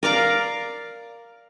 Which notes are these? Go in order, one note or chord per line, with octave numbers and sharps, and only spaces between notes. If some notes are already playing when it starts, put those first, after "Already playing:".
A#4 D5 F5 A#5